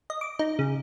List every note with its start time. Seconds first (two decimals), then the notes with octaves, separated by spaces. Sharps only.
0.10 D#5
0.21 D6
0.39 D#4
0.59 C#3